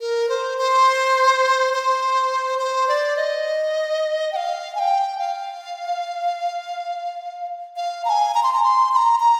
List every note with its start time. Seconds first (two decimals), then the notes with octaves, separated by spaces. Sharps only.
0.01 A#4
0.29 C5
0.58 C5
1.74 C5
2.59 C5
2.88 D5
3.17 D#5
4.32 G5
4.36 F5
4.75 G#5
4.79 G5
5.18 F5
7.76 F5
8.05 A#5
8.09 G#5
8.34 A#5
8.43 C6
8.54 A#5
8.63 C6
8.92 C6
8.96 A#5
9.20 A#5